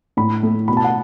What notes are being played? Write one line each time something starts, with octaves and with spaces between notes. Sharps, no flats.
A2 B5
A3
B2 B5
A5
F#5